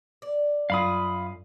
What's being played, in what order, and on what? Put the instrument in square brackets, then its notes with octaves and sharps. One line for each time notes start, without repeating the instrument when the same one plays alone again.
[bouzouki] D5
[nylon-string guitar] F#2 F4 [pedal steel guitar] F5 B5 D#6